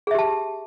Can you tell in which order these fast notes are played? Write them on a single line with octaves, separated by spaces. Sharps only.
G#4 E5 G4 A5